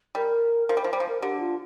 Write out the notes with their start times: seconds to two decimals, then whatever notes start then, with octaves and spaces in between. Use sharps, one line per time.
0.15 G3 A#4
0.68 F3 A#4
0.77 G3
0.81 F3 C5
0.93 G3
0.96 F3 C5
1.08 A#4
1.21 D3 G4
1.40 F4